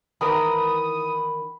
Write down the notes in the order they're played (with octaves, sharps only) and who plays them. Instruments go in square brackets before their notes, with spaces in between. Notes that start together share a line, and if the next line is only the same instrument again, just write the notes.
[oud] D#3 E3 A#4 [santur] B5 [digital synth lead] D#6